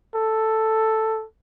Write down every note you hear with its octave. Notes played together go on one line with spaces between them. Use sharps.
A4